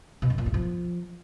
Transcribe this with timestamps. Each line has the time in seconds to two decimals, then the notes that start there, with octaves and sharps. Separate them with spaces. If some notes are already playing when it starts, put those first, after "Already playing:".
0.22 B2
0.30 F#2
0.38 A#2
0.46 G2
0.54 F3